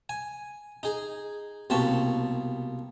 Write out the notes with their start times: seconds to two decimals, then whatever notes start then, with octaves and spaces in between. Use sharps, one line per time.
0.09 G#5
0.83 D#4 G#4
1.70 C2 B2 A#3 G4 A5 C#6